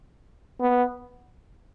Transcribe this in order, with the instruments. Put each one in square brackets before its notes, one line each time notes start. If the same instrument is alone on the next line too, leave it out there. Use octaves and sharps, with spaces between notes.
[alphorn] B3